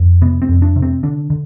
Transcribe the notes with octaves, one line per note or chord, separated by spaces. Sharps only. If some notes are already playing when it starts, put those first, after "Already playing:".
Already playing: F2
C3 B3
C4
F2
D4
C3
C4
D3 D4
D3